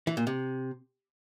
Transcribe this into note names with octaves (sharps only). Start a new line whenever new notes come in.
E3
A#2
C3